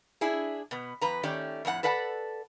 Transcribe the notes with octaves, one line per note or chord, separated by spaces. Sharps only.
D4 E4 G#4
B2 B3
F2 B4 A#5
D#3 A3 C#4 G4 D5
F2 A2 D4 F#5
A4 B4 D5 F#5 G5 A5